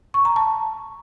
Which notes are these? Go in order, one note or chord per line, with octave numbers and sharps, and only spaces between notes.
C#6
A#5
A5